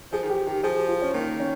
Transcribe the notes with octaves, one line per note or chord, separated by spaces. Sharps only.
F3 G#4
D#3
F3 G4
D#3 G4
F3 G#4
G4
F4
C#4
D#3 A#3
C#4